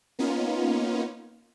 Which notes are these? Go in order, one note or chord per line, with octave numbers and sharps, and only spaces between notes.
A#3 B3 C#4 D#4 F4